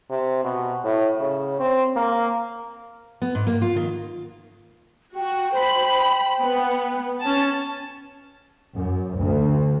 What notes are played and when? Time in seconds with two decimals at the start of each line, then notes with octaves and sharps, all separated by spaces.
0.10 C3
0.44 B2
0.84 A2
1.20 C#3
1.59 C4
1.96 A#3
3.22 B3
3.35 G#2
3.47 A#3
3.62 F4
3.76 D#3
5.16 F#4 G5
5.56 C5 B5
6.41 B3
7.22 C#4 A5
8.74 F#2
9.19 D2